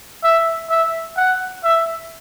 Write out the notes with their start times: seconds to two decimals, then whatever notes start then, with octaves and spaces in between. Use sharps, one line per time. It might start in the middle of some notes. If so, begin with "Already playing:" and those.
0.23 E5
0.70 E5
1.17 F#5
1.64 E5